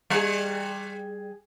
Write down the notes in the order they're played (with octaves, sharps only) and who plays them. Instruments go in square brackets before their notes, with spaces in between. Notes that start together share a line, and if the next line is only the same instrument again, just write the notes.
[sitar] G3 G#4